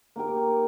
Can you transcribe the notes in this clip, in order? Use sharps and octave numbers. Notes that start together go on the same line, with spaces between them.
A#3 D#4 G4 A#4